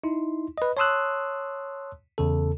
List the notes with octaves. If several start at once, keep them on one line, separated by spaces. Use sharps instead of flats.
D#4 E4 C6
B4 D#5
C#5 A5 C6 D#6 E6 F#6
E2 C#3 A4